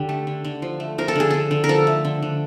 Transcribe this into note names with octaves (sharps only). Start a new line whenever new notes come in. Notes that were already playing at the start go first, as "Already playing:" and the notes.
Already playing: D3 G4
A3
D3
D3
F3
A3
F3 A#4
A4
D3 G#4
D3 A4
D3
A#4
F3 A4
A3
D3
D3